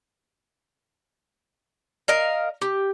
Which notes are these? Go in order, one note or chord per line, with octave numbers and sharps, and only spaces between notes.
A#4 D#5 F5
G4